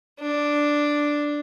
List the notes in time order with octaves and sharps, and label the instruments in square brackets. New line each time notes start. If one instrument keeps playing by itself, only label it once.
[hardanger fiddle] D4